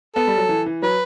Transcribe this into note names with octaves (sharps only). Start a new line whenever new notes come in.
B3 A4
G3
F#3
E3
E3
F#3 B4